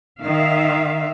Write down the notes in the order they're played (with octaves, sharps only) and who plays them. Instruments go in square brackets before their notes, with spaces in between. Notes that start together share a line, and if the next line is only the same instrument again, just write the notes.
[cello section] D#3 E5 F5